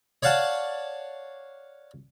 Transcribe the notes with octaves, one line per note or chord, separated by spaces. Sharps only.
C#5 D5 F5 F#5 A5